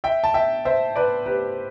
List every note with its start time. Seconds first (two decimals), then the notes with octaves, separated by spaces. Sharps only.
0.04 E5 G5
0.24 A5
0.34 E5 G5
0.65 C5 E5
0.96 B4 D5
1.26 G4 B4